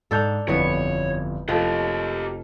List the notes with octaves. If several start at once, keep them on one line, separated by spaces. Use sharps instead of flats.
G#2 D4 A4 G6 F7
G1 F2 E3 B3 C#5
F1 F3 G4 A4 D#5